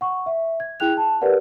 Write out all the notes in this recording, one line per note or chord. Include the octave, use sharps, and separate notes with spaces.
F#5 C#6
E5
G#6
E4 G#4 G5 F#6 F7
A5
G4 A#4 B4 D5 F#5